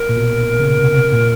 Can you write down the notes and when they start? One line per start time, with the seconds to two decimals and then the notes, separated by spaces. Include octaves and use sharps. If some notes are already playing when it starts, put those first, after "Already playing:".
Already playing: A#4
0.09 A#2
0.16 B2
0.59 C#3
0.78 C3
0.94 C3
1.12 A#2